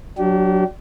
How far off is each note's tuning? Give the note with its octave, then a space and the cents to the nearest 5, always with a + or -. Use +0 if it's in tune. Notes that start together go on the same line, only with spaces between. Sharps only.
F#3 +0 D4 +0 G4 -35